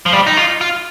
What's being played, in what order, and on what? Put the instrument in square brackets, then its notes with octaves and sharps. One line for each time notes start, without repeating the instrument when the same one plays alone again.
[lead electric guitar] F3
G3
D#4
F4
F4